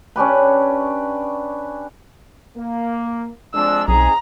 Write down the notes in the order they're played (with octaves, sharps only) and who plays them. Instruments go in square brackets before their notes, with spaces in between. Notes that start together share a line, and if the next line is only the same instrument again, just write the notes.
[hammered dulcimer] C#4 D4 G4 B4
[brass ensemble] A#3
[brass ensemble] F2 G#3 D4 [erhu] E6
[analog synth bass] B1 [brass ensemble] C4 D#4 G#4 [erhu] A#5